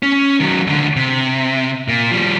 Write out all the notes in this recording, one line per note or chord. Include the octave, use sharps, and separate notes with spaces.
C#4
D#3 F#3
C#2 D3
C3
A#2
F3 G3